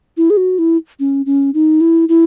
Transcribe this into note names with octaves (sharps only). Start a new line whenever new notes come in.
E4
G#4
F#4
E4
C#4
C#4
D#4
E4
E4